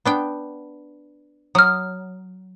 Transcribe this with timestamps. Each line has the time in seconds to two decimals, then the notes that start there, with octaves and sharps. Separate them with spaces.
0.05 B3 D4 G5
1.55 F#3 D#6 F6